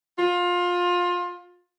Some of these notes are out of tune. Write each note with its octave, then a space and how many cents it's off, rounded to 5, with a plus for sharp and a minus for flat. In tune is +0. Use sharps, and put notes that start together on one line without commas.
F4 +25